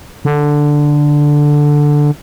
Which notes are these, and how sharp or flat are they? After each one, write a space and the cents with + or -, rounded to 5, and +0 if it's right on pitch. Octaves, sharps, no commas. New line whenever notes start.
D3 +0